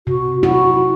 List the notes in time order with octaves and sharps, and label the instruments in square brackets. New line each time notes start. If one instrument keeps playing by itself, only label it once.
[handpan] C3 [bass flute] F#4
[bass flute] E4 [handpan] F#4